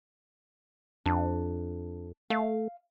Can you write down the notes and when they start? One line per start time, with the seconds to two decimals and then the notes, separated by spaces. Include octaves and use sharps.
1.06 F2 D4
2.30 A3 F5